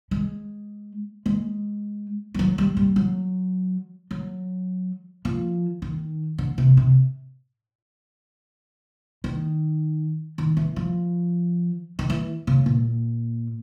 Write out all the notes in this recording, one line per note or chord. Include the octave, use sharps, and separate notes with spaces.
G#3
G#3
G3
F#3
G3
G3
F#3
F#3
F3
D#3
D3
C3
C3
D#3
D#3
E3
F3
D#3
E3
C#3
A#2